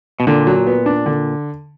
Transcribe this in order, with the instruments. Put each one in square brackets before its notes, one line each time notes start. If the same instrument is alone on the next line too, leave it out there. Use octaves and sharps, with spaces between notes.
[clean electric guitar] B2
[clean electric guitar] A#2 [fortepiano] D3
[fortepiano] F#3
B3
D4
D3